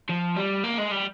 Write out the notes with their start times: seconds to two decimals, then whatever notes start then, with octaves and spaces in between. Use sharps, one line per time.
0.09 F3
0.36 G3
0.64 A#3
0.78 G#3
0.92 G3